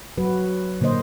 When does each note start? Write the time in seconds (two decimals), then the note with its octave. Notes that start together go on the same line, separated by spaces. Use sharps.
0.18 F#3 F#4 B4
0.81 A#2 D3 A#3 C5 D#5